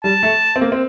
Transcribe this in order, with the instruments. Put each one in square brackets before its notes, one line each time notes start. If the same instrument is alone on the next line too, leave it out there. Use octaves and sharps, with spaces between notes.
[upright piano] G3 [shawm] A5
[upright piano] A3
C4
A#3
C4